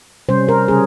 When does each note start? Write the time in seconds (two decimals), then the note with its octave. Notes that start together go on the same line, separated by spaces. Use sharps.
0.29 C3 G3 C#4 C5
0.48 A#4
0.68 C#3 G3 C#4 G#4